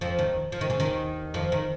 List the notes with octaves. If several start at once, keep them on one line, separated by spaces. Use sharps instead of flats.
F2 F3
D#2 D#3
F3
D#3
C#3
D#2 D#3
F2 F3
D#3